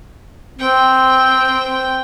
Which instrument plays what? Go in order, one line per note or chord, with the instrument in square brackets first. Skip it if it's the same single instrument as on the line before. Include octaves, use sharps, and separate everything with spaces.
[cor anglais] C4 [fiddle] G5